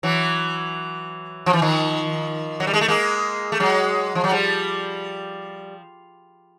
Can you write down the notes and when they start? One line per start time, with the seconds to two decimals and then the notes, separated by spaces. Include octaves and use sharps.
0.03 E3 F#3
1.46 F3
1.53 E3
1.62 D#3 F3
2.60 F#3
2.67 G3
2.74 G#3
2.81 A3
2.88 G#3 A#3
3.52 A3
3.60 F#3 G#3
4.15 F3
4.24 F#3
4.31 F3 G3